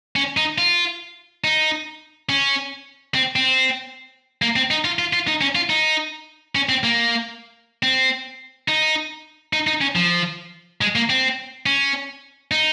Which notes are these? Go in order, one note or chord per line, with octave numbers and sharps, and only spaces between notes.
C#4
D#4
F4
D#4
C#4
C4
C4
A#3
C4
D#4
F4
F4
F4
D#4
C#4
F4
D#4
C#4
C4
A#3
C4
D#4
D#4
D#4
C#4
F3
G#3
A#3
C4
C#4
D#4